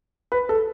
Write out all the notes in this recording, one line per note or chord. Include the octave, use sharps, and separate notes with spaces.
B4
A4